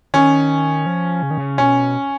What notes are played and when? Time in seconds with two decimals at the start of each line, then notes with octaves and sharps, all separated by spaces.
0.14 D#3 C#4
0.86 F3
1.23 C#3
1.31 D#3
1.38 C#3
1.58 B2 C#4